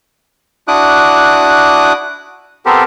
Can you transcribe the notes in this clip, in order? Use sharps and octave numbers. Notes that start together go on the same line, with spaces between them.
D4 E4 F#4 D6 D#6 F#6
B3 C4 G4 A4 A#4 C5